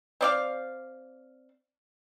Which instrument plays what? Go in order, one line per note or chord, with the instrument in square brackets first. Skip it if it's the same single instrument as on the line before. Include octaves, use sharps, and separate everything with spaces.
[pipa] C4 D5 F5